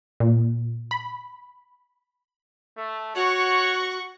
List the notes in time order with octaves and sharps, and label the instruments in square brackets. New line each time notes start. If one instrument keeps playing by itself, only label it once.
[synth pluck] A#2
B5
[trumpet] A3
[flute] F#4 [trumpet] C#5 [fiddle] F#5 C#6